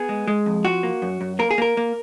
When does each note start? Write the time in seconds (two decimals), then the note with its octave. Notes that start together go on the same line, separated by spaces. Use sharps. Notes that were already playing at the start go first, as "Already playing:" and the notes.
Already playing: B3 G#4
0.09 G#3
0.28 G#3
0.46 F2
0.65 F3 F#4
0.83 A#3
1.02 F#2
1.21 F#2
1.39 A#3 A#4
1.51 G#4
1.58 A#3 A#4
1.77 A#3